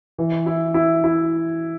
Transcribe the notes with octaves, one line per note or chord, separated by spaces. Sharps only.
E3
E4
E4
E4